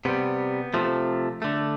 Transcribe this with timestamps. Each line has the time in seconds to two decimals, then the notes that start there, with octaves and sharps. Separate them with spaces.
0.05 C3 G3 B3
0.74 C3 F3 A3
1.42 D3 A3